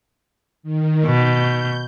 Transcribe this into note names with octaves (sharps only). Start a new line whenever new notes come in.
D#3
B2 G6